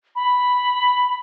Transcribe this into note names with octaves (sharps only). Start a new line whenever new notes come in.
B5